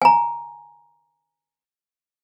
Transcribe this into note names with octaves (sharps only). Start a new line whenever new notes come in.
G#5 A#5